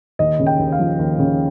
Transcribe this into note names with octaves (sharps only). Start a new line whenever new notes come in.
D#2 D#5
C#3
G5
D#2
F5
F3
D#2
C#3